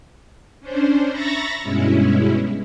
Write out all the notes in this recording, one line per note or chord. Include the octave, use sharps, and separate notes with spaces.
C#4 D4 C5
E5 A#5 B5 C#6 A6 A#6
G2 B2 G#3 C#4 E4